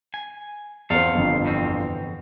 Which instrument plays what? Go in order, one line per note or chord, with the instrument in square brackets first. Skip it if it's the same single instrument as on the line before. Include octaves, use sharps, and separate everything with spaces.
[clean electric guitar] G#5
[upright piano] E2 C4 [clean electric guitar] A4 C5 F5
[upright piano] G1 F2
[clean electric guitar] E2 B2 C4